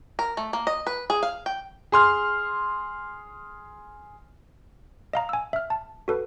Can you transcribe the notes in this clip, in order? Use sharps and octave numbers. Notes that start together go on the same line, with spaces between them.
A#4
A3
A#3
D#5
B4
G#4
F5
G5
G#4 C6 F6
D#5 F5 A#5
G#5 E6
E5 F6
A5
F#4 A4 B4